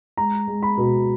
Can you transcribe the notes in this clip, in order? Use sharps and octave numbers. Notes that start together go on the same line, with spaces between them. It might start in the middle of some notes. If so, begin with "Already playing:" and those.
G#3 A#5
G#3
B5
B2